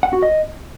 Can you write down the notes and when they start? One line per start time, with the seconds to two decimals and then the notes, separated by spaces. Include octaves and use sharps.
0.03 F#5
0.13 F#4
0.23 D#5